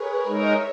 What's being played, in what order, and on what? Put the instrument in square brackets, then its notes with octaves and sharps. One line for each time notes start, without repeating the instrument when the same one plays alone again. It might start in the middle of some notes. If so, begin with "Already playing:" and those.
Already playing: [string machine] G#4 A#4 B4 C#5
[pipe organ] G#3 D#4 A#4 [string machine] C#5 E5